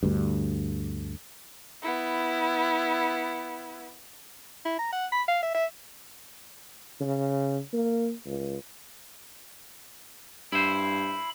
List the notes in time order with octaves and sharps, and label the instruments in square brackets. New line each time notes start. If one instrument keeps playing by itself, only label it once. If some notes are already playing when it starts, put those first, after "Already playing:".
[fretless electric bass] D2 G2
[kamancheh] B3 E4
[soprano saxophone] E4
A#5
F#5
B5
F5
E5
E5
[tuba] C#3
A#3
C#2
[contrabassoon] G2 [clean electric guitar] E4 C5 [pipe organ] B5